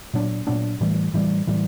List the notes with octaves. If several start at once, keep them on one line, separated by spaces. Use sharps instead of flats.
A#2 F#3 B3 D4
A#2 F#3 B3 D4
A2 E3 G3
A2 E3 G3
A2 E3 G3